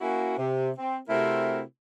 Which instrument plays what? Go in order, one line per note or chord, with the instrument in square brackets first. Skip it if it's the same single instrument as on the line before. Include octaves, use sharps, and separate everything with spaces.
[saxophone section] A#3 C#4 E4 F#4
C3
C4
C3 A3 C4 E4 F#4 A#4